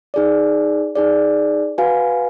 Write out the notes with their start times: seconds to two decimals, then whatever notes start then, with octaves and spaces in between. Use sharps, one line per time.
0.14 D#4 G#4 D5
0.95 D#4 G#4 D5
1.78 F#4 B4 F5 G#5